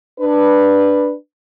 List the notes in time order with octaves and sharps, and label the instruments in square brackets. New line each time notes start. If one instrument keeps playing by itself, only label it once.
[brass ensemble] D4 B4